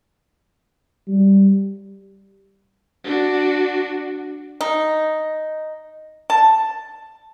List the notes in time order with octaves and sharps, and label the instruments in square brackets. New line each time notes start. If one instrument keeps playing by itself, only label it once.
[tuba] G3
[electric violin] D4 F#4
[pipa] D#4
A5